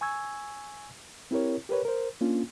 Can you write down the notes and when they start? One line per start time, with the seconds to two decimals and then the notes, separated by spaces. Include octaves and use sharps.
0.01 G#5 C#6 E6 G#6
1.31 C4 E4 G4 A#4 C#5
1.69 G4 A#4 B4 C#5
1.85 A#4 C5
2.21 A#3 C#4 D4 F4